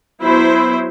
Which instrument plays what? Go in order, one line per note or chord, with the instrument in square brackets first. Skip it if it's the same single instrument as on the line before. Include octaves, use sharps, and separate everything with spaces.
[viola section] F#3 B3 E4 C5